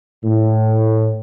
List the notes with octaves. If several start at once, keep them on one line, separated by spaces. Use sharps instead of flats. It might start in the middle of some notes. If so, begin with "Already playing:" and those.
A2